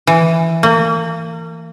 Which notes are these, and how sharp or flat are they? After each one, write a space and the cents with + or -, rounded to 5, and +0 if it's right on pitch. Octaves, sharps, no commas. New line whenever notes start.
E3 +5
A#3 -35